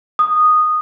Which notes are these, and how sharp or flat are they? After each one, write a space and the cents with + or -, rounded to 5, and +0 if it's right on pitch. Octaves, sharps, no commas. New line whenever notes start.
D#6 -10